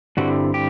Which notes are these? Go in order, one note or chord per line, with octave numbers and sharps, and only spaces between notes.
G2 D3 G3 C4 E4 F#4
G4